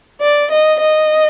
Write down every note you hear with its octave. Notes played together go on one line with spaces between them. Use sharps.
D5
D#5
D#5